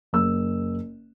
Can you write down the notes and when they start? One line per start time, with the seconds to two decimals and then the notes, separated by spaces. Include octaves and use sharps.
0.13 F#1 E6